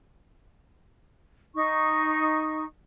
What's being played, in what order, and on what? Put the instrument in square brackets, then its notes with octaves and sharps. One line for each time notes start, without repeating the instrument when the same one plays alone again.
[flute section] D#4 C#6